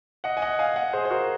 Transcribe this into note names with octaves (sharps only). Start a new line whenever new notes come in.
D#5 F#5
G#5
D#5 F#5
F5 G#5
D#5 F#5
G#4 C5
C5
F#4 A#4